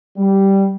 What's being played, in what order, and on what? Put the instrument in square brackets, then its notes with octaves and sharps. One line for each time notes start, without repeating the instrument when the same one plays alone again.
[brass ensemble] G3